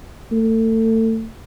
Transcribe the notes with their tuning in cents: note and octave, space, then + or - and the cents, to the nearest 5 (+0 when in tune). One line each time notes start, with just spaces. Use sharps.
A3 +30